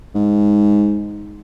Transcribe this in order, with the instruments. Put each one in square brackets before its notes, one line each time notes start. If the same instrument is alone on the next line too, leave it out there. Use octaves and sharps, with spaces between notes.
[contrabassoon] G#2